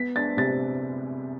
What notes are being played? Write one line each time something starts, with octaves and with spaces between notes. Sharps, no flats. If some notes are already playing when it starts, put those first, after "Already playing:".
Already playing: B3 B6
D4 A6
C3 A6